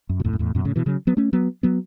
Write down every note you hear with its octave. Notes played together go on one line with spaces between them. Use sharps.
F#2
B2
E2 A2
F#2
E2 A2
F#2 B2
A2 C#3
B2 E3
C#3 F#3
F#3 B3
A3 C#4
F#3 B3
F#3 B3